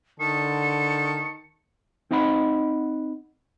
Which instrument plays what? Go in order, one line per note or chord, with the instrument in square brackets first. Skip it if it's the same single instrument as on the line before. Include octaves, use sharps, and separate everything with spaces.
[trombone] D3 [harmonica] D#3 A5 [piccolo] C#7
[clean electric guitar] C4 D#4 D#5 F#5 B5